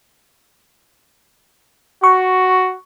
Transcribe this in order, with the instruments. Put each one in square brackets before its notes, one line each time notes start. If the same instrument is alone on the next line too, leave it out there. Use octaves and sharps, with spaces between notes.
[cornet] F#4 [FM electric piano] C#6